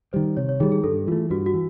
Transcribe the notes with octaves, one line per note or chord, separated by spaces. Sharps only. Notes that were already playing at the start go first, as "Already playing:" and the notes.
D#3 G3 C5
C3 C#5
C#5
D#3 G3 G#4
G#4
G2 A4
E3 A3 F4
G2 F#4
F#4
E3